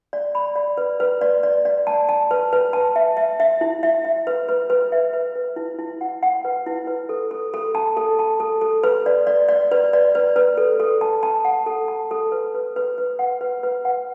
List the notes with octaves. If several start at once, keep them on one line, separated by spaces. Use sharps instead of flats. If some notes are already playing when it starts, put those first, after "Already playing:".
D5
B5
D5
B4
B4
D5
D5
D5
A5
A5
B4
B4
A5
E5
E5
E5
E4
E5
E5
B4
B4
B4
E5
B4
B4
E4
E4
F#5
F#5
B4
E4
B4
A4
A4
A4
A5
A4
A5
A4
A4
B4
D5
D5
D5
B4
D5
B4
B4
A4
A4
A5
A5
F#5
A4
A5
A4
B4
B4
B4
B4
F#5
B4
B4
F#5